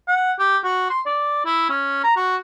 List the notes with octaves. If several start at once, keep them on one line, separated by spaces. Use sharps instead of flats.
F#5
G4
F#4
C6
D5
E4
C#4
A#5
F#4